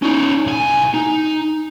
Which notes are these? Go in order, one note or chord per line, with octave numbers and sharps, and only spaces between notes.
C#4 D#4
C2 G#5
D#4